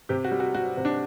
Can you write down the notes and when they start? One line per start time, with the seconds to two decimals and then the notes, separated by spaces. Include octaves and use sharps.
0.09 C3 G4
0.24 F#4
0.32 G3
0.40 F#4
0.54 G3 F#4
0.77 C3
0.85 D4